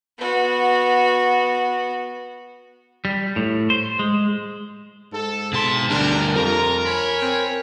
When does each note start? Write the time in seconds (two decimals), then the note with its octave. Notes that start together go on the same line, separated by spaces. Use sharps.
0.18 B3 F#4
3.05 G3
3.36 A2
3.70 C5
3.99 G#3
5.13 G#2 A4
5.53 B2 A5 C6
5.90 D2 G3 D4 A#4
6.35 F2 F4 A#4 A#5
6.86 C#5 G#5 B5
7.22 C4